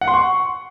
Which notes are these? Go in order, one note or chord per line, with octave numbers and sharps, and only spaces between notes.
F#5
C6
C#6